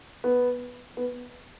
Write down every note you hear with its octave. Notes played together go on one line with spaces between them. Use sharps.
B3
B3